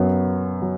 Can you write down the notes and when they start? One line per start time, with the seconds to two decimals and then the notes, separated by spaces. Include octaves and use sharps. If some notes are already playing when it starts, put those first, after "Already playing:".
Already playing: F#2 F#3 B3
0.62 F#3